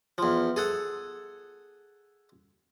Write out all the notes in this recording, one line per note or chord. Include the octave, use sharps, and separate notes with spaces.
E2 F3
G#4 A4 F#5